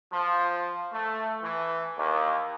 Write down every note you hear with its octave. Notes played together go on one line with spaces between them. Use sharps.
F3
A3
E3
D#2